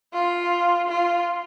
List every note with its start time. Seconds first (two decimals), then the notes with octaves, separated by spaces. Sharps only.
0.13 F4
0.88 F4